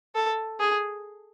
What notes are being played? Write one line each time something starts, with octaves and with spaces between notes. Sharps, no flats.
A4
G#4